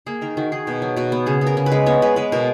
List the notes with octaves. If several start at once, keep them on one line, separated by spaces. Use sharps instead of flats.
A#3 G#4
D#3 A#4
D#3 F#4
D#3 G#4
B2
F#3
B2 F#4
B3
C#3 G#4
B3
A#4
C#3
B4
G#3
B3 C#5
G#3 B4
G#3 B4
B2 A#4